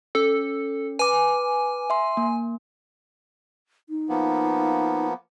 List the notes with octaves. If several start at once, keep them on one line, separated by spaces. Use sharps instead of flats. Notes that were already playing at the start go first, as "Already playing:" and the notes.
C#4 A4
B4 G#5 D6
E5 C6
A#3
D#4
F3 A#3 B3